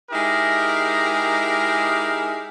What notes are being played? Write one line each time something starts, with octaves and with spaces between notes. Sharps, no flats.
G#3 D#4 E4 G4 A#4